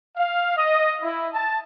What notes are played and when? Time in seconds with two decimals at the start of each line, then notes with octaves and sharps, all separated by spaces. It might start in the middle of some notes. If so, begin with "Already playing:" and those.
0.17 F5
0.57 D#5
1.02 E4
1.34 A5